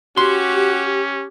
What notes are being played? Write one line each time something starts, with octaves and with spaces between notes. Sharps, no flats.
C#4 F#4 G4 C6